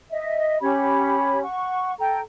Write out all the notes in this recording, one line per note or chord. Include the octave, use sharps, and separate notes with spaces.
D#5 E5
C#4 G4 C#5 B5
F#5 C#6
A4 G5 A#5